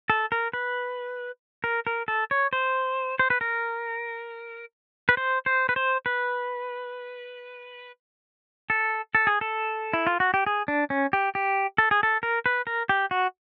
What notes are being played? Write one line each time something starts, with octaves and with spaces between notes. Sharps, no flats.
A4
A#4
B4
A#4
A#4
A4
C#5
C5
C5
B4
A#4
B4
C5
C5
B4
C5
B4
A4
A4
G#4
A4
E4
F4
F#4
G4
G#4
D4
C#4
G4
G4
A4
G#4
A4
A#4
B4
A#4
G4
F#4